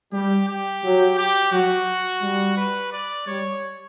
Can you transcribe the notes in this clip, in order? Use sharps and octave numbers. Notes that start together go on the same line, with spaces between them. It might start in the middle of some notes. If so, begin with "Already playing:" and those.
G3 G4
G4
F#3
G4
F#3 F#4
G3
B4
D5
G3 C#5